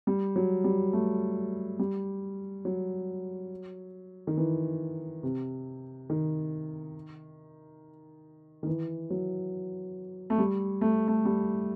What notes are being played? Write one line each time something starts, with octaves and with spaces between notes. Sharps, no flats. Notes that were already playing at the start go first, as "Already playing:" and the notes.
G3
F#3
G3
A3
G3
F#3
D#3
E3
C3
D#3
D#3
E3
F#3
A3
G3
A3
A3
G3